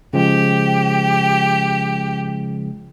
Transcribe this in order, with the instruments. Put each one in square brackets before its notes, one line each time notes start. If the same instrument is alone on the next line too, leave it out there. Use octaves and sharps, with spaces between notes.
[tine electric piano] C#3 F3 G#3 [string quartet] G4